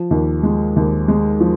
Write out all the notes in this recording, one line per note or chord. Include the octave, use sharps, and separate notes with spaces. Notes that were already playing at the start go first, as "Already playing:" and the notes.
Already playing: F3
D#2
G#3
D#2
G#3
F3